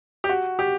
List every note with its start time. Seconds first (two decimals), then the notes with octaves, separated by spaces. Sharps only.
0.24 G4
0.29 F#4
0.59 G4